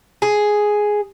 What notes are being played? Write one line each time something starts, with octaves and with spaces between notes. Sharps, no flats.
G#4